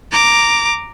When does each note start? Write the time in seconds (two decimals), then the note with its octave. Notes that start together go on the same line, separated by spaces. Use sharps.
0.12 A#5 D6